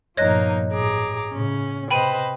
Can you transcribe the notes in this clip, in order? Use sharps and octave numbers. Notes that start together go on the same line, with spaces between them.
G1 A#2 F3 A#3 D#4 C#5 D#5 F#6
A1 G#4 A#5 D6
A2 C#3 C#4
C3 B4 C5 D#5 G5 B5 D#7